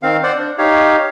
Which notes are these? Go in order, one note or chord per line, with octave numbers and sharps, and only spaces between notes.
D#3 C4 F5
C5 D5 F#5
D4
D#4 G4 C#5 F5